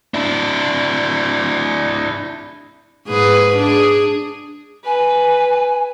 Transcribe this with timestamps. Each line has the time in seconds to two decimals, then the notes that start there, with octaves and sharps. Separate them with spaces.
0.14 D4 E4
3.07 G#2 G#4 B4
3.57 D4 G#4
4.85 B4 G#5